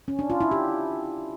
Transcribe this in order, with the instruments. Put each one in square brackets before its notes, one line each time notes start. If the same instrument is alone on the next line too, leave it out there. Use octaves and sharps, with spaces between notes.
[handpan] C#4
D4
F4
E4
G4